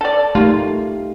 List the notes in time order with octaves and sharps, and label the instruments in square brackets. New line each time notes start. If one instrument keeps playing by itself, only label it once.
[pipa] A4 D5
[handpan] A3 D#4 G4 [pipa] A#3 F4